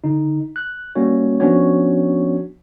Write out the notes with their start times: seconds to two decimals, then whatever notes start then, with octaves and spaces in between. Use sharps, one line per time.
0.04 D3 D#4
0.56 F#6
0.95 G3 A#3 C#4 F#4 C#5
1.40 F3 B3 C#4 D4 F#4 C#5